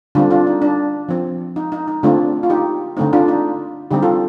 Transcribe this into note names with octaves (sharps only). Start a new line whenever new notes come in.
D3 G3 C4 D4 F4
D4 F4
D#4
D4
F3 C4
D#4
D#4
D#4
D3 A3 C4 D4 F4
F4
D#4 G4
D3 A3 C4 D#4
D4 F4
D#4
D3 G3 C4 D#4 G4
F4 A4